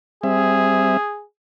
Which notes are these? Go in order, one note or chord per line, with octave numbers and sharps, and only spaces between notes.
G3 C4 G#4 E5